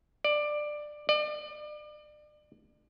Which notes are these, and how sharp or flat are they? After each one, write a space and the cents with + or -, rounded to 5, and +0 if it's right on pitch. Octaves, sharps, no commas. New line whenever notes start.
D5 +15
D5 +35